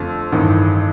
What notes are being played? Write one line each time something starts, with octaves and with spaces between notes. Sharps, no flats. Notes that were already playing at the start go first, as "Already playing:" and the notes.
Already playing: F2 D3 F3 A3
A1 G2 D#3